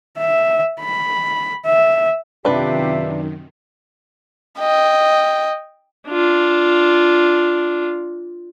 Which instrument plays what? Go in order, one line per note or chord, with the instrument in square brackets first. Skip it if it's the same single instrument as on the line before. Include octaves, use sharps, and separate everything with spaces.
[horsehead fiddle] E5
B5
E5
[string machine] F#2 D#3 [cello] C3 [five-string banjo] D4 B4 [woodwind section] F4 G4 E5
[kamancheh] D#5 G5
[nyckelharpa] D4 F4